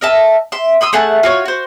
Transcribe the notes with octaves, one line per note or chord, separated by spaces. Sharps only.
A#4 D#5 E5 A5
E5 C6
B5 C6 D#6 E6
A3 G#4 F#5 A5
F4 F#4 C#5
F#4 C5